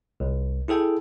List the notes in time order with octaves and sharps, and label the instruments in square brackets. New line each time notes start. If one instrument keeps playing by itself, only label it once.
[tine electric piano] C2
E4 G#4 A4 G5